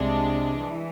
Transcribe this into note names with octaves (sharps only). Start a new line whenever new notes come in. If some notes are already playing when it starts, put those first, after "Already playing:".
Already playing: C2 C3 G#3 D4
E3